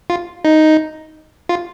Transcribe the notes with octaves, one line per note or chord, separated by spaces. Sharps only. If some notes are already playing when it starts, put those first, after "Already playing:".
F4
D#4
F4